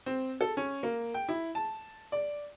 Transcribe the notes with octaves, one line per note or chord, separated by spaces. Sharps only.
C4
A4
C#4
A#3
G5
E4
A5
D5